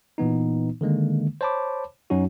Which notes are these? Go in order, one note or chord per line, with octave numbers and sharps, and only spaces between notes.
A#2 E3 B3 D#4
D3 D#3 G#3 A#3
C5 C#5 A5 B5 D6
F#2 F#3 C#4 D#4 F#4